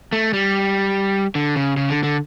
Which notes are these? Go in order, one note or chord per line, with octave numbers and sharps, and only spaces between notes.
A3
G3
D3
C#3
C#3
D3
D3